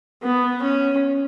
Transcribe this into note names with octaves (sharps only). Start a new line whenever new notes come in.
B3
C#4